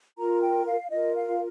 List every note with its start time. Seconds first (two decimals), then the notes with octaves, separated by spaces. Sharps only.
0.17 F4 A#4 A#5
0.42 G5
0.65 F5
0.90 F4 A#4 D#5
1.14 F5